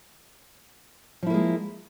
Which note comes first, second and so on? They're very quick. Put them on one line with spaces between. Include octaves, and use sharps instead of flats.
F3 E4 A#3 G#3